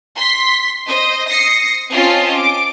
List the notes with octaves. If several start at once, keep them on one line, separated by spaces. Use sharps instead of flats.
C6 B6
C5 D#5
D#6 A#6 C7 C#7
C4 C#4 F4 D#5 A5
D6